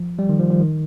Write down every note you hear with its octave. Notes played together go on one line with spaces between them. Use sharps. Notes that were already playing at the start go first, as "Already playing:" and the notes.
Already playing: F3
G3
D#3
F3
F3
D#3